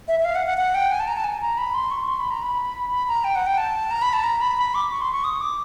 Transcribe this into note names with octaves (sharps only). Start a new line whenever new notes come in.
E5
E5
F5
F#5
F#5
F#5
G5
G#5
A5
A#5
A5
G#5
A#5
B5
C6
C#6
C6
B5
A#5
B5
B5
A#5
G5
F#5
G5
A5
A#5
B5
A5
A#5
B5
B5
D6
C#6
C6
C#6
D#6
D6